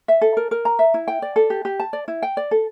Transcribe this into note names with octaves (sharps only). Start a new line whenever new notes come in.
E5
A4
A#4
A#4
A#5
E5
E4
G5
D5
A4
G4
G4
A5
D5
E4
G5
D5
A4